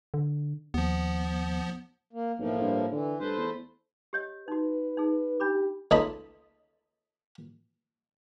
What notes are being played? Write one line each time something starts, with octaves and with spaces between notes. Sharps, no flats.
D3
D#2 F3 B3
A#3
B1 A2 F3 A#3
G2
D3 E3
G2 A3 B4 C5
E2
G4 C#5 D#5
D#4 F#4 B4
D#4 G#4
D4 G4 B5 D6
C#2 A3 D#4 D#5 A5 B5